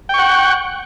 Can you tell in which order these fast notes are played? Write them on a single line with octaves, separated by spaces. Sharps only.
G5 C#6 F#5